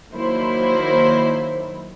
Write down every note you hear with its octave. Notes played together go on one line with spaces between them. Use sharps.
D#3 F#3 A#3 E4 C5